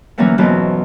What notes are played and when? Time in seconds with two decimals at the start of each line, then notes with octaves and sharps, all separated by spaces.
0.18 D3 E3 F#3 A3 A#3 C#4
0.38 F2 G#2 B2 E3 F#3